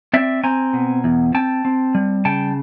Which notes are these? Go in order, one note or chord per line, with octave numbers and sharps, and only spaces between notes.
C4 D5 E5
C4 G#5 A#5
B2
E2
C4 G5 A5
C4
G3
C#3 G5 A5